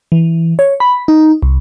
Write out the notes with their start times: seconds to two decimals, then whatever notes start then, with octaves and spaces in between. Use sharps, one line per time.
0.12 E3
0.59 C#5
0.80 B5
1.08 D#4
1.42 C2